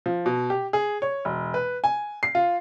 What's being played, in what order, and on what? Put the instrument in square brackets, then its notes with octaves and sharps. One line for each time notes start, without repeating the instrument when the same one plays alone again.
[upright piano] F3
B2
G4
G#4
C#5
E1
B4
G#5
C7
F4